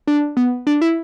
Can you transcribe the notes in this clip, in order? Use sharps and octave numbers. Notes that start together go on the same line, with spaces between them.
D4
B3
D4
E4